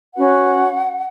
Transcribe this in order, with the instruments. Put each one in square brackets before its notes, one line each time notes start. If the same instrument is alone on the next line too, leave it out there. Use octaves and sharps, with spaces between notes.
[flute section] C#4 F#4 B4 F#5